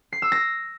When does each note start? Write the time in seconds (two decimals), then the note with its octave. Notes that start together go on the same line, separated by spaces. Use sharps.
0.13 C7
0.22 E6
0.32 A#6